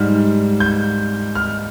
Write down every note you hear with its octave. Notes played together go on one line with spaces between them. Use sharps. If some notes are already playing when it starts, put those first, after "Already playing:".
Already playing: G#2 G3 F6
G6
F6